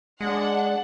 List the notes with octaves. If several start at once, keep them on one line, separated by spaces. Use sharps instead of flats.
G#3 D4 F#5